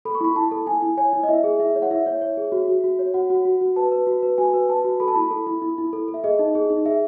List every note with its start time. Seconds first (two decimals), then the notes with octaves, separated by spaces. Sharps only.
0.05 A4 B5
0.15 C#6
0.21 E4 B5
0.36 E4 A5
0.51 A4
0.67 E4 G#5
0.82 E4
0.97 C#5 G#5
1.13 E4
1.23 D#5
1.29 E4 E5
1.44 G#4
1.60 E4 E5
1.75 C#5
1.82 F#5
1.91 E4 E5
2.06 C#5
2.22 C#5
2.37 G#4
2.52 F#4
2.68 F#4
2.84 F#4
2.99 C#5
3.14 F#4 F#5
3.30 F#4
3.45 F#4
3.61 F#4
3.76 B4 A5
3.92 B4
4.07 F#4
4.23 B4
4.38 F#4 G#5
4.54 B4
4.69 B4 A5
4.85 F#4
5.00 A4 B5
5.08 A5
5.15 E4 B5
5.31 A4
5.47 E4
5.62 E4
5.78 E4
5.93 A4
6.08 A4
6.14 E5
6.24 G#4 D#5
6.39 D#4
6.55 G#4
6.70 D#4
6.85 G#4 E5